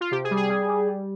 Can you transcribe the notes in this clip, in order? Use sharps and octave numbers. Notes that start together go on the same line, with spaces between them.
F4
C3 G4
G#4
G3
G#4
G3
G3
G3